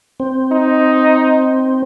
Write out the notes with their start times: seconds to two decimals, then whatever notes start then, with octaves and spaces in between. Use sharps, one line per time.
0.20 C4
0.52 D#4